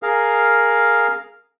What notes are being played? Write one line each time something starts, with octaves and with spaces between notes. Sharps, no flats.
G#4 A#4 F5